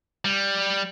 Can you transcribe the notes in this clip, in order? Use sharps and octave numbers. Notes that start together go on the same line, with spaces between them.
G3